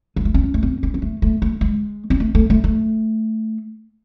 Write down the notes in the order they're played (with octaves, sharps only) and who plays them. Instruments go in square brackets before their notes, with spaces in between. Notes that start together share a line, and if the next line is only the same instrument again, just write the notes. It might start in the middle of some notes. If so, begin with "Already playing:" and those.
[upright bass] G#3
A3
C4
C#4
A3
C4
C4
C4
A3
A3
A3
G#3
C4
A3
A3
A3
A3